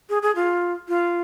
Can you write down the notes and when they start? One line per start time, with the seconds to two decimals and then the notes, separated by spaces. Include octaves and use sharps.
0.09 G#4
0.22 G#4
0.36 F4
0.89 F4